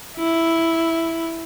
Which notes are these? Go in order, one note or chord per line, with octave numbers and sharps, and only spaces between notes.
E4